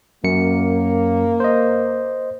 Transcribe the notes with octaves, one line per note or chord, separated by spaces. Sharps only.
F#2 A#3 C#7
C5 D#5